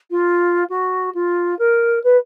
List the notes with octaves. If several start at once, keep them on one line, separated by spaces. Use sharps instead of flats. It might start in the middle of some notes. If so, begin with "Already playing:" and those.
F4
F#4
F4
A#4
B4